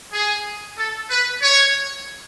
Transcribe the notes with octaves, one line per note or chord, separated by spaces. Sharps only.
G#4
A4
B4
C#5